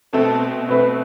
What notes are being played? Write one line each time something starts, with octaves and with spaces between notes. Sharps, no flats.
B2 A3 C4 A4
B2 A3 C4 B4